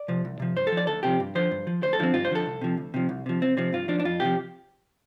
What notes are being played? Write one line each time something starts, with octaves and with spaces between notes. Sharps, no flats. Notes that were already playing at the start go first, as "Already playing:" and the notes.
Already playing: D5
C3 F3
C2
C3 F3
G2 C5
A4
F3
D5
D2 A4
C3 F3 G4
G2
D3 F3 C5
G2
F3
D2 C5
A4
D3 F3 C4
G2 F4
C5
D3 F3 A4
C2
C3 F3
D2
C3 F3
C2
C3 F3
C2 C4
C3 F3 C4
G2 F4
F3 D4
D4
F2 F4
C3 F3 G4